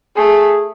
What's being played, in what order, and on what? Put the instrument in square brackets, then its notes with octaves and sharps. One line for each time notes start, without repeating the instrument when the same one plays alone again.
[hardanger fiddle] A3 [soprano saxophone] G#4